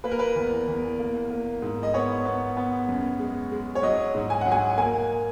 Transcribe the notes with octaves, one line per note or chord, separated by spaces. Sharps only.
A#3 B4
A#4
B4
E2
E2
A#3
A#3
G#2
D#5
B3 C#5
B3
B3
F#2
G#3
G#3
C#5
F#3 D#5
G#2
G#5
F#3 F#5
G#5
A#3 G#5